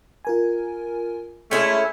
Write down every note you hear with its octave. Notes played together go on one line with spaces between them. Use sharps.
F4 A#4 G#5
G#3 A3 C#4 E4 G6 B6 C#7